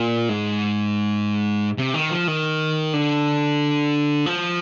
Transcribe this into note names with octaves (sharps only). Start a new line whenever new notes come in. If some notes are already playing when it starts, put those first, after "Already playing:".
Already playing: A#2
G#2
C3
D#3
F3
D#3
D3
F3